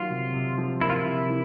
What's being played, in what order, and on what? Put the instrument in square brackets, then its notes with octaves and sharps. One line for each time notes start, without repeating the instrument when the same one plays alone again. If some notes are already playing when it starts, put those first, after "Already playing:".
Already playing: [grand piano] D#3 F#3 A#3 [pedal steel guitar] F4
[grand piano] C3
C3
F3
[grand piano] A#3 [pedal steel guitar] E4
[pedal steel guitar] F4
E4
[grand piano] C3
E3